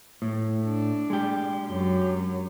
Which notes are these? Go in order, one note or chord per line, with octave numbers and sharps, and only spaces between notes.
A2
D4
G#3 G4
F#2 F#3